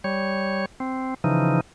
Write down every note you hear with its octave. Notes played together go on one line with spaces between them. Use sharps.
G3 C#5
C4
C#3 E3 F3 D#4